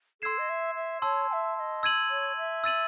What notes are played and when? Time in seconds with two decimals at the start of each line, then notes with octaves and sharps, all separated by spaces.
0.21 A4 C6 E6 G#6 C7 E7
0.38 D#5
0.49 E5
0.75 E5
1.02 C#5 A5 C6 E6
1.29 G#5
1.33 E5
1.56 E5
1.60 D#5
1.83 E6 G#6 D#7 F#7
2.10 C#5
2.37 E5
2.64 E6 A6 D#7 F#7